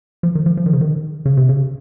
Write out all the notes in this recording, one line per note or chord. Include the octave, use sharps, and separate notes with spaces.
F3
D#3
F3
F3
D#3
C#3
D#3
C#3
C3
C#3